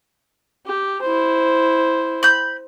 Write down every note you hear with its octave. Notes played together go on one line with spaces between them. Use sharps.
G4
E4 C5
B5 G6